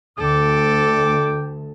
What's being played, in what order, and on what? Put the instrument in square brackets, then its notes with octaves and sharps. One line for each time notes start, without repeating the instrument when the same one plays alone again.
[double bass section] D2 [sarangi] A4 [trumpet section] G5 D6